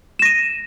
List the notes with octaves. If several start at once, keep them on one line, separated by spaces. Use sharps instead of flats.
A#6 D#7 E7